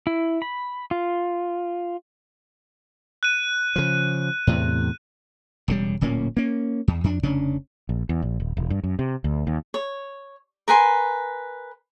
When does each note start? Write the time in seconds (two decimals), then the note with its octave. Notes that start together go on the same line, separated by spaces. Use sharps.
0.07 E4
0.42 B5
0.91 F4
3.23 F#6 D#7
3.76 C#3 F3
4.47 E2 A2 C3
5.68 E1 C#3 G3
6.01 D1 A#2 A#3 C#4
6.37 A#3 C#4
6.88 E2
7.04 F2 D4
7.23 F1 C#3 C#4 D4
7.89 A#1
8.09 E2
8.22 A#1
8.40 D#1
8.57 E1
8.70 G2
8.83 F#2
8.99 C3
9.24 D2
9.47 D#2
9.74 C#5
10.68 A#4 B4 G#5 C6